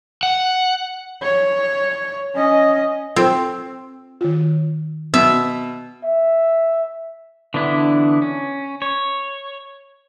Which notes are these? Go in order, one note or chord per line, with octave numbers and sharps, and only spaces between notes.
F#5
C#5
C#4 D#5
C4 F4 A4 C5
D#3 F4
B2 E5
E5
D3 E3 B3 D4 E4
C#4
C#5